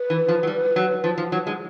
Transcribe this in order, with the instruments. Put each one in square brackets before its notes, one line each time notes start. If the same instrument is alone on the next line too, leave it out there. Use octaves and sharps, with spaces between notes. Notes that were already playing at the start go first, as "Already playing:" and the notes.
Already playing: [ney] B4
[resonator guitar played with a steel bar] E3
F3
F#3
G3
F#3
F3
F3
F#3
G#3